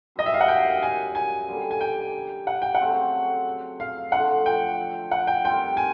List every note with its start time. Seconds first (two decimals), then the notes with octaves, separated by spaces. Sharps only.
0.16 F#2 D#3 G3 D#5
0.26 E5
0.34 F5
0.41 F#5
0.48 G5
0.82 G#5
1.15 G#5
1.48 D3 G3 A#3
1.71 G#5
1.81 G5
2.47 F#5
2.62 G5
2.75 F#5
2.80 C#3 F#3 A3 C4
3.80 F5
4.12 D3 F3 A3 F#5
4.46 G5
5.11 F#5
5.27 G5
5.44 D#3 G3 C4 F4 G5
5.77 G#5